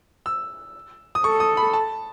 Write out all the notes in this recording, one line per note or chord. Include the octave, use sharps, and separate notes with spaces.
E6
D#6
A4 C#6
D#6
B5
A5